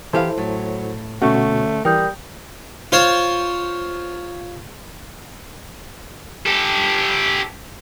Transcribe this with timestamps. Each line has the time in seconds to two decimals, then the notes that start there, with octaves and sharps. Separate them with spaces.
0.13 E3 E4 G4 A4 C5 F5
0.38 A2 F#3
1.22 D2 B2 A3 C#4 F#4
1.85 E3 G3 A#4 G5 D#6 G6
2.92 F4 C5 C#5
6.46 G4 A4